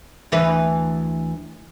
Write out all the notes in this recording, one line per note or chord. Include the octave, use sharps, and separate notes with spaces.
D2 E3 B4